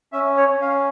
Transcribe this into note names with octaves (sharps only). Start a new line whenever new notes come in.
C#4 E5
C#5
C#4
F5